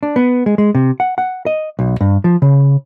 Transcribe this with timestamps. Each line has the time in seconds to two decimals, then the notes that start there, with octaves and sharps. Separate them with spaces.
0.03 D4
0.16 B3
0.46 G#3
0.58 G#3
0.75 C3
1.00 F#5
1.18 F#5
1.46 D#5
1.79 B1
2.01 G2
2.24 F3
2.42 C#3